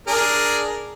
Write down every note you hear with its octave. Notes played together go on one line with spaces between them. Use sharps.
D4 G#4 A#4